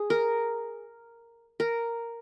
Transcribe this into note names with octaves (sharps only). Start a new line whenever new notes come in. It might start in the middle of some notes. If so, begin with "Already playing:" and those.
Already playing: G#4
A#4
A#4